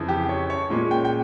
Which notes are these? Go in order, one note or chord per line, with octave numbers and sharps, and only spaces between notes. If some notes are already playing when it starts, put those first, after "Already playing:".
Already playing: F2 C#3 E3
G4
C#5
C#5
A#2 G#3 C#4
G5
G5